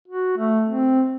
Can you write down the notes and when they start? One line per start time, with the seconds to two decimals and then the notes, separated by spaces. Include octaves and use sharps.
0.08 F#4
0.38 A3
0.68 C4